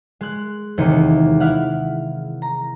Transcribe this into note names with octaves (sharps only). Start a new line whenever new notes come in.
G#3 F#6
E1 D#2 C3 E3 D#4 C#7
E4 F5 F#5
A#5